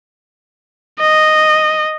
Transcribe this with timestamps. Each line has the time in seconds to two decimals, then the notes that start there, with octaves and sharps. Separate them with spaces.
1.00 D#5